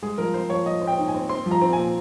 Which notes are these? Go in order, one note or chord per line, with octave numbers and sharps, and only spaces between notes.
G#3 G#4
F3 A#4
C4 C5
F3 C#5
F3 D#5
C4
G5
D#4
G#5
C4
C4 C6
F3
A#5
C4
A#2 G#5